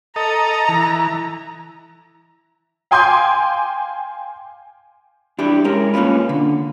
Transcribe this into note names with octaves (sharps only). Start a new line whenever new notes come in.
A4 D#5 A#5
E3
F5 G5 G#5 C6 D6 G6
D4 E4 G4
G#3 C#4 A#4
A#3 C#4 D4 F4 B4
D3